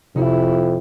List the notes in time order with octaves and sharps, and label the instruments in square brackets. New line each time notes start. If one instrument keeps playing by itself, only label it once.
[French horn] F2 [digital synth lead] C3 [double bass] E4